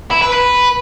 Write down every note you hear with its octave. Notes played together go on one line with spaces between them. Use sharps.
E4
B4
B4